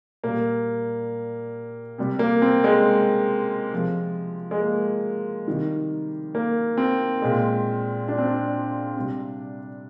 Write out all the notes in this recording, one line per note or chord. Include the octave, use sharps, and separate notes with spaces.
A#2 G3 A#3
C3 G3
A#3
C4
G#3
C3 F3 G#3
G#3
A#3
C3 D#3 G3
A#3
C4
A#2 G#3
D4
C4
D4
C3 G3